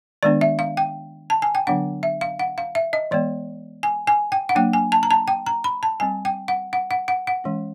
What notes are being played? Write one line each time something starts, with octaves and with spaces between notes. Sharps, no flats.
D#3 G#3 B3 D4 D5
E5
F5
G5
A5
G#5
G5
D3 F#3 B3 D4 F#5
E5
F5
F#5
F5
E5
D#5
E3 G#3 B3 D5
G#5
G#5
G5
F#5
F#3 A#3 D4 G5
G#5
A5
A#5
A5
G5
A#5
B5
A5
G3 C4 G#5
G5
F#5
F#5
F#5
F#5
F#5
E3 G#3 C#4